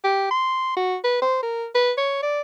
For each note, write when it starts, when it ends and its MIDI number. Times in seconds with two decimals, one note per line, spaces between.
0.04 0.29 67
0.31 0.72 84
0.77 0.97 66
1.04 1.20 71
1.22 1.39 72
1.43 1.67 70
1.75 1.92 71
1.98 2.18 73
2.23 2.41 74